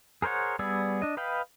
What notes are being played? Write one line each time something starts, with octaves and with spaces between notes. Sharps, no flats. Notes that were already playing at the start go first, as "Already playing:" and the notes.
G#4 A#4 C5 C#5 F#5
G3 B3 G#4 D5 E6
D4 D#5
B4 D#5 F5 G5 B5